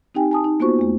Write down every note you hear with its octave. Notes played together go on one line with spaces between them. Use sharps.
C4 D#4 G4 G5 G#5
G#5 A5 D#6
D#4
A#3 B3 F4 F#4 C5 C#6
E2 A3